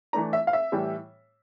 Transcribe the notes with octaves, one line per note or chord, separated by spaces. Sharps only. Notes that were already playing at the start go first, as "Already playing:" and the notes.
E3 A3 D4 A#5
E5
F5
E5
A2 E3 G3